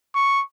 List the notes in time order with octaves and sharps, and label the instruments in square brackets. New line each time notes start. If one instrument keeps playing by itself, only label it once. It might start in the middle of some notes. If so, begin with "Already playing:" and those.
[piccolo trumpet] C#6